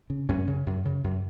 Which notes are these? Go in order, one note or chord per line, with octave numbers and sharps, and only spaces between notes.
C#3
F#2 C#4
C#3
F#2
C#3
F#2